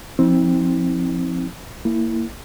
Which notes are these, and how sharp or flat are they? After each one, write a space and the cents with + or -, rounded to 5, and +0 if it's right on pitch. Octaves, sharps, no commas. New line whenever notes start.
F3 +0 C4 +10 E4 -45
A#3 -20 E4 +0